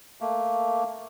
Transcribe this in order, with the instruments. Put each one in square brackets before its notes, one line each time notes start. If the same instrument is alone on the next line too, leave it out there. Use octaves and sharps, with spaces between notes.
[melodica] A3 A#3